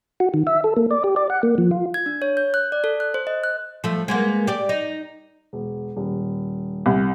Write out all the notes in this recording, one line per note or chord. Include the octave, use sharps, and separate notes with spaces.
F#4
D#3
E5
A4
A#3
D5
G4
D5
F#5
A#3
F3
F4
G#6
D4
C#5
G6
F#6
D5
A4
F#6
C5
D#5
F#6
F3 A3
G#3 A#3 B3
G4 D5
D#4
E1
D#1
C2